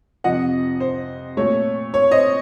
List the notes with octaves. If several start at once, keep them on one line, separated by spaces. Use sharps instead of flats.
F2 C3 F3 D#5 F#5
C5
A#2 A3 C#5
C#5
C5 D#5